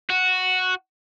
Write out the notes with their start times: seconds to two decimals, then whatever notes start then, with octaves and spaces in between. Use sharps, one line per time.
0.10 F#4